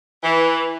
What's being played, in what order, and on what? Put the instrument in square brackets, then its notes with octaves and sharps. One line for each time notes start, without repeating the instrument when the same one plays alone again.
[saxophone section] E3